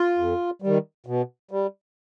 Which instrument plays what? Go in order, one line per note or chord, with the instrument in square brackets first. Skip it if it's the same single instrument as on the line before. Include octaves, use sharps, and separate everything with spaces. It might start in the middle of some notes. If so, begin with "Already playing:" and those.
Already playing: [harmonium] F4
F2
D#3 G3
B2
G3